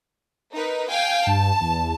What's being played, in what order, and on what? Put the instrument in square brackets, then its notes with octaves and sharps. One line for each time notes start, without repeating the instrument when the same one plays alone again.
[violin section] D#4 A#4 B4
F5 G5 G#5
[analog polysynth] G2 [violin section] A5
[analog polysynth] E2